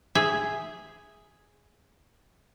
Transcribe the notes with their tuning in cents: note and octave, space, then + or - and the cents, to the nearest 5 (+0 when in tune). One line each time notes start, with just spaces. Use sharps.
G#4 +0 E5 +0